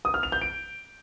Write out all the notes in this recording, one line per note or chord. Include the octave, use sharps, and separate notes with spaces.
D#6
F6
F7
G6
D7